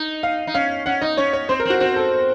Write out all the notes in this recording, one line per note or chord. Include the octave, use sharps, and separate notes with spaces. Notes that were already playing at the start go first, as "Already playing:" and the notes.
Already playing: D#4
F5
D#4
C#4 F5
C#4 F#5
D#4 D#5
C#4 C#5
C#5
C4 C5
A#4
C4 F#4
C4 F#4
A4